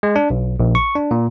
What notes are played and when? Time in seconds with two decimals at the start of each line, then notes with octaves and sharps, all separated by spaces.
0.03 G#3
0.16 D4
0.30 B1
0.60 A#1
0.75 C#6
0.95 D4
1.11 A#2